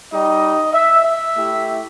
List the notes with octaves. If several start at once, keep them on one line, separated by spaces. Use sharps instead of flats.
G3 D#4 G4 D#5
E5
E5
A3 E4 G4